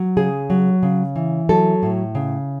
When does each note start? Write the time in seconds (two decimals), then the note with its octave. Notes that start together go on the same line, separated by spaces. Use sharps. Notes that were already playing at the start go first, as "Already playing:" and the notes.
Already playing: F#3
0.17 C#3 G#4
0.50 F#3
0.83 C#3
1.16 E3
1.49 F#3 A4
1.83 A2
2.15 C#3